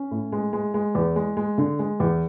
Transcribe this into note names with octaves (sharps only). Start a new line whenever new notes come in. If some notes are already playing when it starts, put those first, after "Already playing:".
Already playing: C#4
A2
G#3
G#3
G#3
E2
G#3
G#3
D3
G#3
E2